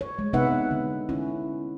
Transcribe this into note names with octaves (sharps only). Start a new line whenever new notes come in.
C#5
G#3
C3 B3 D#4 B4 E5 F#5
D3
C#4 E4